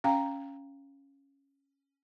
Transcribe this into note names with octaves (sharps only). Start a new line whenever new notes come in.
C#4 F5 G5 A#5